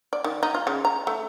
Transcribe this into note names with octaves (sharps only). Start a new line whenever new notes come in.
D5
D#3
D#4
F4
C#3
A#5
A3